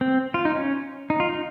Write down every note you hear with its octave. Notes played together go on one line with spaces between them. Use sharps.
C4
F4
D#4
C#4
D#4
F4
D#4